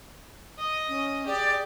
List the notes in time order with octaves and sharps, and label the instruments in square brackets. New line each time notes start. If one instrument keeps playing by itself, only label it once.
[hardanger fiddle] D#5
[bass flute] C#4
[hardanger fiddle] G4 [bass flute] G#4 [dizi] D5